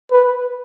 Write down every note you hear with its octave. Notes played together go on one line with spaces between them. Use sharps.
B4